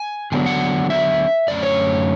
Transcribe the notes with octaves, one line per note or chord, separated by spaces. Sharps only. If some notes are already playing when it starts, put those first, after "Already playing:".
Already playing: G#5
D3 F#3 B3 D4 G#5
F#5
E5
F#2 D3 A3 C#4 D5
C#5